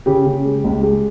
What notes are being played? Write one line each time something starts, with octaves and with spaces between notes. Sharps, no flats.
C#3 G4
C#3
G#3
C#2
G#3